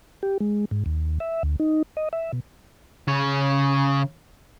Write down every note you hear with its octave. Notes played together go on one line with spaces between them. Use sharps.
G4
G#3
G#2
D#2
E5
D2
D#4
D#5
E5
B2
C#3 C#5